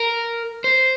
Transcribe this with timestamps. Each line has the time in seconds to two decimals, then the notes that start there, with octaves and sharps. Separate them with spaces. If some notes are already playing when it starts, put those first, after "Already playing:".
Already playing: A#4
0.64 C5